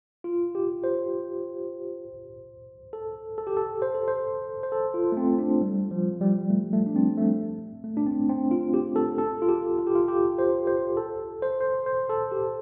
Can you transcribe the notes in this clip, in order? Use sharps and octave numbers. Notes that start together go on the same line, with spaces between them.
F4
G4
C5
A4
A4
G4
A4
C5
A4
C5
C5
A4
F4
A3
C4
D4
G3
F3
G3
A3
A3
D4
C4
A3
A3
D4
C4
C4
F4
G4
A4
A4
F4
G4
F4
G4
F4
G4
C5
C5
A4
C5
C5
C5
A4
G4